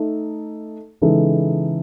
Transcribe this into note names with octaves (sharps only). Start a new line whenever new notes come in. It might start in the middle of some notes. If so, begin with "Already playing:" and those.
Already playing: A3 D#4 A4
C#3 E3 G#3 D#4 A4